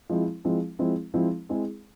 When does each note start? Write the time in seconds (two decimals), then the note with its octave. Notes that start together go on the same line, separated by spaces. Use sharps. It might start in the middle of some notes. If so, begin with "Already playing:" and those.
0.10 F3 G#3 C4 E4
0.45 F3 G#3 C4 E4
0.79 F3 G#3 C4 E4
1.14 F3 G#3 C4 E4
1.49 G#3 C4 E4 G#4